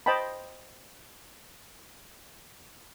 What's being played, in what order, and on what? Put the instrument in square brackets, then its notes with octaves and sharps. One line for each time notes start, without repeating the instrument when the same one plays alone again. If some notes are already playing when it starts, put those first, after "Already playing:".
[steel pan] C5 D#5 G5 A5 B5